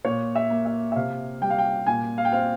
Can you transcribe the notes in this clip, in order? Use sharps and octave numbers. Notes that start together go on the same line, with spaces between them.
A#2 C#5
E5
A#3
E5
E5
C3 F5
G3 G5
F5
G5
A#2 G#5
F5
G5
C4 F5